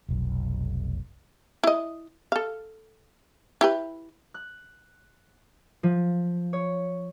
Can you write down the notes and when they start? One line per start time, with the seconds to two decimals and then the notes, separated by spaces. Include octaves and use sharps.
0.09 F1 B1
1.64 E4 D#5
2.32 A4 F5
3.61 E4 G4 B4
4.34 F#6
5.83 F3
6.53 C#5